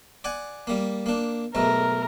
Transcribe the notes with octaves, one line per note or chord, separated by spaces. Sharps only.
D5 F#5 G#5
G3 A#3
A#3 D4
B1 G#2 A3 A#4